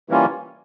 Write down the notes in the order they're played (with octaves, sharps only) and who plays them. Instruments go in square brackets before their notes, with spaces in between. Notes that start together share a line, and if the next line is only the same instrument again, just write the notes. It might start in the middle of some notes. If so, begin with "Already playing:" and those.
[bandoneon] E3 G3 A#3 C#4 F4